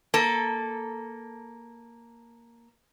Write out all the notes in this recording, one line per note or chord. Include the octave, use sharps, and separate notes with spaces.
A#3 A4